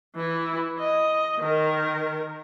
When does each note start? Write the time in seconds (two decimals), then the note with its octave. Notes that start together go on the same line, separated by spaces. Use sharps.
0.16 E3 E4
0.79 D#5
1.40 D#3 A#4